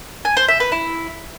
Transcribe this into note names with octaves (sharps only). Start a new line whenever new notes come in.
G#5
C5
E5
B4
E4